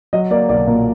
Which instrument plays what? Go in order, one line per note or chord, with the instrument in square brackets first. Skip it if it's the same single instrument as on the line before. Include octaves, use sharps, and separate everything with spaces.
[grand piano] F#3 D#5
A#3 D5
B1 D5
A#2 A#4